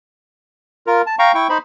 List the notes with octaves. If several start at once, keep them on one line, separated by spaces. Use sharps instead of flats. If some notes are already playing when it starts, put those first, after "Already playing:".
F4 A#4
A5
F5 G5 A#5 C#6
E4 G5 C#6
D#4 C5 B5